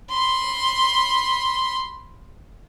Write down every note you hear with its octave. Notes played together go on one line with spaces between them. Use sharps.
B5 C6